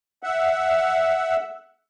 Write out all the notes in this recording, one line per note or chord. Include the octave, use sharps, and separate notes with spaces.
E5 F#5